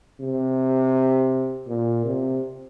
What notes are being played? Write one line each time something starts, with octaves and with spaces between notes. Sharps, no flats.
C3
A#2
C3